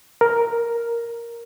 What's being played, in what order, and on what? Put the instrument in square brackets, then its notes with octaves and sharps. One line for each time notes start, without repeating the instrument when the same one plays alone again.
[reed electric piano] A#4